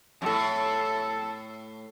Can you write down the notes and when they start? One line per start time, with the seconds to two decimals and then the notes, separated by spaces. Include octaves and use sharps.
0.22 F#2 A2 A4